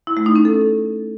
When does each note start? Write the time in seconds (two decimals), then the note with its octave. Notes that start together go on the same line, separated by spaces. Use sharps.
0.07 E4
0.17 A3
0.26 D#4
0.36 C#4
0.45 A4